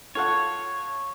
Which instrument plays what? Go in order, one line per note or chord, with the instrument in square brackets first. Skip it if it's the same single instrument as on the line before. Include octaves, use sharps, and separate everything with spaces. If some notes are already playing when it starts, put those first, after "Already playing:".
[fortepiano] F4 A4 F#5 [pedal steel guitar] C#5